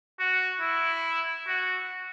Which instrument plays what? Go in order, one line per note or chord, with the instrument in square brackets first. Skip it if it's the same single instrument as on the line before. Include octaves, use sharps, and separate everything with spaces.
[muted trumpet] F#4
E4
F#4